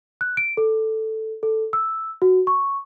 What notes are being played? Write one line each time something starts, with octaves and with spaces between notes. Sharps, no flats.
F#6
D7
A4
A4
E6
F#4
C#6